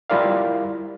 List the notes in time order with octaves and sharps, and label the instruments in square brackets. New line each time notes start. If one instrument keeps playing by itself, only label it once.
[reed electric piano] G3 E4 F4 A#4 D5 F5